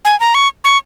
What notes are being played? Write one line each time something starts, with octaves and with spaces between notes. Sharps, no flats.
G#5
A#5
C#6
C#6